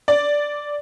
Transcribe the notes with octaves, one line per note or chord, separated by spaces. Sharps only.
D5